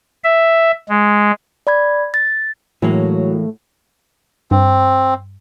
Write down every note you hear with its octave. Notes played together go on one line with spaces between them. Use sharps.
E5
G#3
D5 B5 G#6
A6
A2 E3 F#3 G#3 A#3
G2 C4